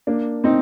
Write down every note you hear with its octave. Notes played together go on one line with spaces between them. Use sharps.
A#3 D4
C4 D#4